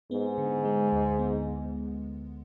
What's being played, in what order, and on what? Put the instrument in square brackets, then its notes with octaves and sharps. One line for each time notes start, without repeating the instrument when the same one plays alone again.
[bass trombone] G#2 [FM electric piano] B3
[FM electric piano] D3
G#3
D2
B3